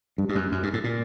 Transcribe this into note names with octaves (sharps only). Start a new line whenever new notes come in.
G2
G2
F#2
F#2
G2
A2
A#2